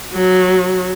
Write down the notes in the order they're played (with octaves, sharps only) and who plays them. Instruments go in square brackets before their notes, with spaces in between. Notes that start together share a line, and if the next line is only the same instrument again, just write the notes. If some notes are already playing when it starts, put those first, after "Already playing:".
[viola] F#3